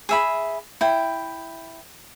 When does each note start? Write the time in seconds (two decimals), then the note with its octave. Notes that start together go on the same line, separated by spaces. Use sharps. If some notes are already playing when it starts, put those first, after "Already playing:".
0.09 G#4 E5 B5
0.81 E4 G5